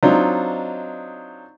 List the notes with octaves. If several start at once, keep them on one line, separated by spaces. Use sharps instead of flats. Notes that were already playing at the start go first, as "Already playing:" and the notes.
F#3 C4 D4 D#4 F4 D#5